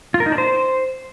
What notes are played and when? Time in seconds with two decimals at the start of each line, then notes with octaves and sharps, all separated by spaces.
0.14 F4
0.20 A#4
0.26 D#4
0.32 D4
0.38 C5